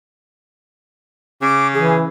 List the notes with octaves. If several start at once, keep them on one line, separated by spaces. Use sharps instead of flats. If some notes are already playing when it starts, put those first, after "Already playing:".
C#3 D6
E3 G#4